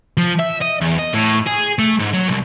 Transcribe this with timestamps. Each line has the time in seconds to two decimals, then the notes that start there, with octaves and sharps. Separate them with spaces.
0.17 F3
0.40 E5
0.62 D#5
0.81 E2
0.99 D#5
1.14 A2
1.47 G#4
1.79 A3
1.99 G#2
2.13 F#3
2.28 C2